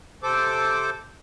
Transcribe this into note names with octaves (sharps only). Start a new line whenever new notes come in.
C3 A4 C5 D6